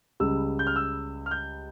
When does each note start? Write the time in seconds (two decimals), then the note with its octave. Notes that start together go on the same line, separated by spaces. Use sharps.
0.20 C#2 C#3 G3 E6
0.59 G6
0.67 F6
0.76 E6
1.26 F6
1.31 G6